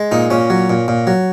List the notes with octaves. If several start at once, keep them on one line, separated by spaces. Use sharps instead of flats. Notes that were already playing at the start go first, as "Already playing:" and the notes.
Already playing: G#3
A#2 D#4
A#2 C#4
F#3
A#2
A#2
F#3